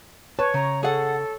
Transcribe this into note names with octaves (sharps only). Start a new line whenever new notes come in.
B4 C#5 A5
C#3 A#5
G#4 A4 F#5